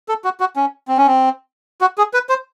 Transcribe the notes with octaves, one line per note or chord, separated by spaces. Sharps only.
A4
F#4
F#4
C#4
C4
C#4
C4
F#4
G#4
B4
C5